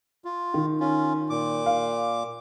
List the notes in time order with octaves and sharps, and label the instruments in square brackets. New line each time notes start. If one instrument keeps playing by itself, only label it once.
[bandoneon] F4
[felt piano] D#3
[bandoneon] C#4 F4
A#2 D6
[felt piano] F5